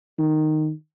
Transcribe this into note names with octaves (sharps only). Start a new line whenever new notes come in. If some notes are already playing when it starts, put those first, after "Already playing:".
D#3